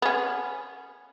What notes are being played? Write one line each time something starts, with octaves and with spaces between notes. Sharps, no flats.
B3 C#4